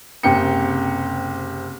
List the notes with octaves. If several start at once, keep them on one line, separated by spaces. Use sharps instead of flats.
F#1 C3 G5 C#7